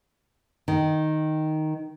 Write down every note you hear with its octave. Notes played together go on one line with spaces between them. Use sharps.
D#3